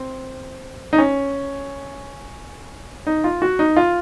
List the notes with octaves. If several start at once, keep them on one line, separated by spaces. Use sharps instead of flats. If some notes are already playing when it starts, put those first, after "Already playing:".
Already playing: C4
D#4
C#4
D#4
F4
F#4
D#4
F4